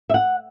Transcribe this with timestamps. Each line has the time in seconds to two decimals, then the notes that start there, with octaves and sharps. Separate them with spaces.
0.09 E5
0.14 F#5